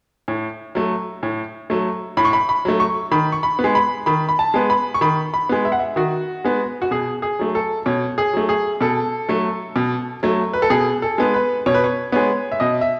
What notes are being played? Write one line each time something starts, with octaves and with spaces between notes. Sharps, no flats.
A2
F#3 A3
A2
F#3 A3
A2 B5
C#6
B5
B5
F#3 A3
C#6
D#3 B5
C#6
B5
B3
G#3
B5
D#3 B5
B5
A5
G#3 B3
B5
C#6
D#3 B5
B5
G#3 B3
E5
F#5
E5
D#3 F#4
G#3 B3
F#4
B2 G#4
G#4
F#3 A3
A4
B2 C#5
G#4
F#3 A3
G#4
B2 A4
F#3 A3
B2
F#3 A3
B4
A4
B2 G#4
A4
G#3 B3
B4
B2 C#5
B4
C#5
G#3 B3 C#5
E5
B2 D#5
E5